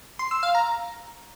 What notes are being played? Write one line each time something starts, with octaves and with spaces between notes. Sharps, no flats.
C6
E6
F5
A#5